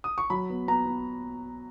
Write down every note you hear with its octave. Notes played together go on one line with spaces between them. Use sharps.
D#6
C#6
F#3 B5
B3
B3 A#5
B3